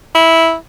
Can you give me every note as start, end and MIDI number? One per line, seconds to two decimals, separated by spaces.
0.15 0.55 64